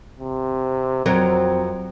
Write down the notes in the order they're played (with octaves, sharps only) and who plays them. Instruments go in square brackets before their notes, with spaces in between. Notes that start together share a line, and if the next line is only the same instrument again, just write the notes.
[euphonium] C3
[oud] F2 F#3 A#4 [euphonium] C4